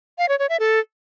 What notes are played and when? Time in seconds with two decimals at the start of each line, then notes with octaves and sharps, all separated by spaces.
0.18 F5
0.29 C#5
0.39 C#5
0.49 E5
0.60 A4